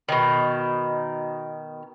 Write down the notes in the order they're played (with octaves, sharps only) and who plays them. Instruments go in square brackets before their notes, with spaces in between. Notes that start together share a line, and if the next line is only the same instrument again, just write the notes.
[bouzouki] B2 D#3